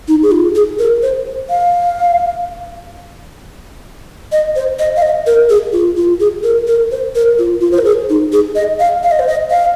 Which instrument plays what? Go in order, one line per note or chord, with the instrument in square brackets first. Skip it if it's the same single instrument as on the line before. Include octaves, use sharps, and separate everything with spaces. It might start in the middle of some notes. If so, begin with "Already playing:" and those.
[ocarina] D#4
G#4
F4
G#4
A#4
C5
F5
D#5
C5
D#5
F5
D#5
A#4
G#4
F4
F4
G#4
A#4
A#4
C5
A#4
F4
F4
C5
A#4
G#4
D#4
G#4
D#5
F5
F5
D#5
C5
D#5
F5